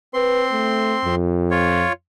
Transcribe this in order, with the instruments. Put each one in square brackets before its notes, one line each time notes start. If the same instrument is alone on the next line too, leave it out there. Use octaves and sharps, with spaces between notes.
[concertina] C4 C6 [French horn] B4
[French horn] A3
F2
[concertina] F4 C#5